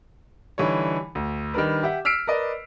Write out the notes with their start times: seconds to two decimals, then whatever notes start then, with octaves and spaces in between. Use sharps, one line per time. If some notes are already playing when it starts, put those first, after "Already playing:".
0.58 D3 E3 G3 D#4 C#5
1.15 D2
1.54 D#3 G3 D4 A#4 B4
1.83 G4 E5 F#5
2.05 E6 F6 B6 C7 D7
2.27 A#4 B4 D5 D#5